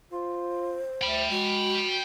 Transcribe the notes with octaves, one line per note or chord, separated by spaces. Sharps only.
F4 C5
D2 G5 B5
G#3 F#4